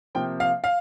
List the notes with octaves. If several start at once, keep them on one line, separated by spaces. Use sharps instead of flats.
C3 F3 A#3 G5
F5
F5